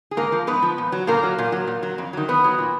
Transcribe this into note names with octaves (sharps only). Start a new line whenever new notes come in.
G#4
G#2 A#3 A#4
F3
G#2 B3 B4
F3
A#2
F#3
A#2 A#3 A#4
F#3
A#2
F#3
A#2
F#3
F2
D#3 F#3
F2 B3 B4
D#3 F#3
A#2